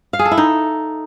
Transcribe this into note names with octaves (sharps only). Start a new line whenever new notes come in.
F5
G#4
A4
E4
D#4